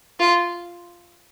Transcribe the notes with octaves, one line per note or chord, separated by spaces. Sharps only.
F4